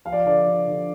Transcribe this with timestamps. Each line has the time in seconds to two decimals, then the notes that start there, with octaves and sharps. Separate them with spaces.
0.05 F3 F5
0.12 D5
0.25 D3 D5
0.47 D3
0.68 D3